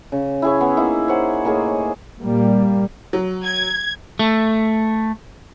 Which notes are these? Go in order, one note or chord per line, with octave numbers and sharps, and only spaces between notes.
C#3
E4 G#4 C#5
B3
A#3 D#4 E4
C5 C#5 F#5 G#5
A2 A#3 G#4 D#5
A#2 G3 A#3
F#3
G#6
A3